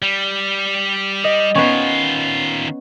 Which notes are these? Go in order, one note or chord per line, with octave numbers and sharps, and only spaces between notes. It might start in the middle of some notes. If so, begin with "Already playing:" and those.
G3
D#5
D#3 B3 C#4 F4